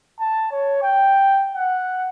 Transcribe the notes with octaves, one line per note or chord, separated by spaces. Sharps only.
A5
C#5
G5
F#5